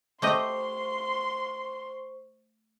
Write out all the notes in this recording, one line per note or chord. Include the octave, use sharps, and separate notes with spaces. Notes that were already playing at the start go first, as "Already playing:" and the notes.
A3 G4 C5 D#5 C6 C#6